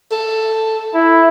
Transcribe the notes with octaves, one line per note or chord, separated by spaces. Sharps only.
A4
E4